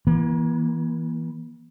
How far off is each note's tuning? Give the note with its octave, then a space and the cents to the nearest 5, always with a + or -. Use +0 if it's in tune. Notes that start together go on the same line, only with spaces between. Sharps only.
E3 +0 A#3 +35